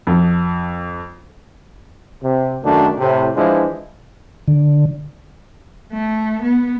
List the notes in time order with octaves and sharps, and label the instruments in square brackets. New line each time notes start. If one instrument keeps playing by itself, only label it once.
[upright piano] F2
[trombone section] C3
F#2 D#3 F#3 A3 D4
A2 C3
E3 F3 G#3 D4 E4
[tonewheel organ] D3
[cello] A3
B3